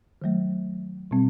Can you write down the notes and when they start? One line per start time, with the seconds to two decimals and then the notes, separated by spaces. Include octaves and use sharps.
0.22 D#3 F#3 A3
1.11 B2 G3 C4